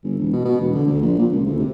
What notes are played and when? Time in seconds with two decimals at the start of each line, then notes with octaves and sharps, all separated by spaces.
0.04 G1
0.19 E1
0.33 B2
0.45 B2
0.61 E1
0.75 D3
0.87 D2
1.02 A#1
1.19 A#2
1.32 C#2
1.46 D2
1.59 C3